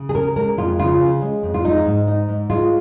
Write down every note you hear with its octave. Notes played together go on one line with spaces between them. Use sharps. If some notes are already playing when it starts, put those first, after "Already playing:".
Already playing: C#3
G#4
C#4 A#4
G#3 A#4
F2 F4
C#3 F4
C#4
G#3
F2
F4
G#3 D#4
G#2
D#4
G#2
G#3 F4